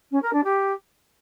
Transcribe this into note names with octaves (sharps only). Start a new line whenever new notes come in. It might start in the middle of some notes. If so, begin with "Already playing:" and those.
C#4
A#4
D4
G4